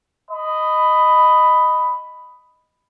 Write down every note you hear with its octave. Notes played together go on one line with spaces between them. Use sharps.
D#5 B5